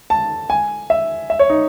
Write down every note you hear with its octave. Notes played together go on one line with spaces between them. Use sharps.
A5
G#5
E5
E5
C#5
D#4